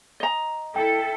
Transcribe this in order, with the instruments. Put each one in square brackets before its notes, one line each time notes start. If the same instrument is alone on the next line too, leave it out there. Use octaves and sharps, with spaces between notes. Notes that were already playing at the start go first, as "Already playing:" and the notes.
[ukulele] D#5 A#5
[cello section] E4 A4 [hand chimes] G5